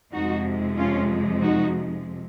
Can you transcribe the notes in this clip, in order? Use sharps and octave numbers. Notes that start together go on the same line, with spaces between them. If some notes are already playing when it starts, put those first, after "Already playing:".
F2 C3 F3 G#3 D#4 F#4
C#4 F4
D#4 F#4